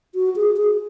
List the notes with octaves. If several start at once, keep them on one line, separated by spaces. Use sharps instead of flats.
F#4
G#4
G#4